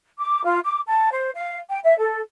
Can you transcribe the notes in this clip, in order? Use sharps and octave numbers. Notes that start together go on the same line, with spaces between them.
D6
F4
D6
A5
C5
F5
G5
E5
A4